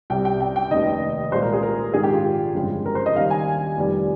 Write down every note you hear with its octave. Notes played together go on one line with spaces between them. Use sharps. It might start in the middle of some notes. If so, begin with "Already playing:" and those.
C2 C3 G3 G5
G5
G5
G5
F1 D#2 D#3 D#5
C2 A#2 G#3 C5
A#4
G#4
A#4
A#1 G#2 D#3 G#3 G#4
G4
F4
G1 F2 C#3 G#3
A#4
C5
D#5
D#2 D#3 G3 F5
G#5
F1 F2 D#3 G3